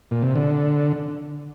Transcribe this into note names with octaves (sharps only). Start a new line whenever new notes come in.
A#2
C3
D3